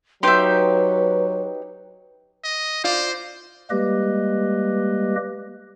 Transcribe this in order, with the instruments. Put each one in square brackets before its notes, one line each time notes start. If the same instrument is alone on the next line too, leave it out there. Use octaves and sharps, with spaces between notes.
[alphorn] F#3 [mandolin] D#4 G4 [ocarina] B4 [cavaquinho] E5 C6
[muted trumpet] D#5
[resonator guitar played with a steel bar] F4 D5 [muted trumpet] C5
[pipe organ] G3 G#3 A#3 G4 B4 D#5